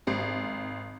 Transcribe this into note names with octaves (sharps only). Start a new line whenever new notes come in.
G#1 C4